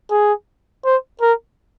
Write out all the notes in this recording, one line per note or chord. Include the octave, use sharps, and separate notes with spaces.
G#4
C5
A#4